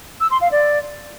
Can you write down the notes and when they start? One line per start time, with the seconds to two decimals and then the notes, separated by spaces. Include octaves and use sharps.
0.20 E6
0.31 C6
0.41 F5
0.52 D5